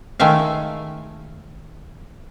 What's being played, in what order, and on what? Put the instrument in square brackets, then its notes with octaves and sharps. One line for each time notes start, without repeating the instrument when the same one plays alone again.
[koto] D#3 G#3 A3 E5 F5